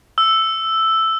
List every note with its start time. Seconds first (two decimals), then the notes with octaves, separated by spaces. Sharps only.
0.18 E6